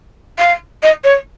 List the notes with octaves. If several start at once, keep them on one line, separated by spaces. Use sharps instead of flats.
F5
D#5
C#5